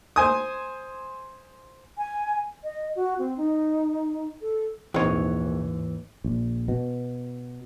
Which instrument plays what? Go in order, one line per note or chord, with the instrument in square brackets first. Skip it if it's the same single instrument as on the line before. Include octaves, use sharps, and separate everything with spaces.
[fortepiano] C5 G#5 D#6
[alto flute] G#5
D#5
F#4
C4
D#4
A4
[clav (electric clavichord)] A#1 C#5 [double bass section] D#2 G#2 [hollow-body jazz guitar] E3 [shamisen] C4 D#4
[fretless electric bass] A#1
B2